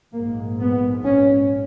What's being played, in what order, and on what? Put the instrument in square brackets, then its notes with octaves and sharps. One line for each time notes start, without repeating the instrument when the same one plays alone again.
[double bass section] A#1 G#2 A#3
B3
C#4